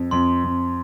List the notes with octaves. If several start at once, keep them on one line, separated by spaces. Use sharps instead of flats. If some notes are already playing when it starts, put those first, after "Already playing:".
Already playing: F2
F2 C6
F2